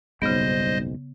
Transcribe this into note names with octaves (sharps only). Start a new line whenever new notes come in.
F#1 B1 G#2 C#3 G3 B3 C5 D#5